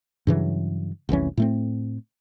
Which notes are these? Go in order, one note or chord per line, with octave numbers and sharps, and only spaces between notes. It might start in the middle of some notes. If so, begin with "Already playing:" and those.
G2 C#3 E3 F#3
F1 C2 E3 C#4
A2 A3 C4